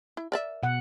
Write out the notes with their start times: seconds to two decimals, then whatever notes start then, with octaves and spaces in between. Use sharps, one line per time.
0.17 E4
0.32 A#4 D5 E5
0.63 B2 F#5